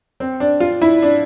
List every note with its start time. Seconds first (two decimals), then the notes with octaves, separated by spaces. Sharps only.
0.20 C4
0.40 D4
0.60 F4
0.82 E4
1.02 D4